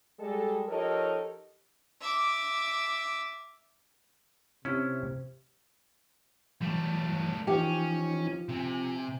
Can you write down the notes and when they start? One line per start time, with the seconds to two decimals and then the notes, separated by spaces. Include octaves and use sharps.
0.19 G3 G#3 A4
0.68 F3 D#4 G4 A4 A#4 C#5
2.01 E5 D6
4.65 C3 C#4 E4
6.62 E3 F#3 G3 A3
7.47 E3 F3 C#4 D#4 G4
8.49 C3 G#5